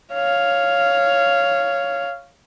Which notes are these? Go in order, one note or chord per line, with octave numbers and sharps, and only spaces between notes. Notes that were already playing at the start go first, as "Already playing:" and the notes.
C#5 F5